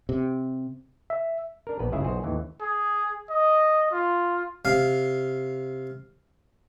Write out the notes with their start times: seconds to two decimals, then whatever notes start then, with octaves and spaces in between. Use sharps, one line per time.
0.09 C3
1.10 E5
1.67 D4 A#4
1.79 A#1 B3 B4
1.92 G1 C#2 C#3 E4 G#4 E5
2.04 B1 F#4 G#4 C5
2.24 D#2 A2 E3
2.60 G#4
3.30 D#5
3.91 F4
4.65 C3 F5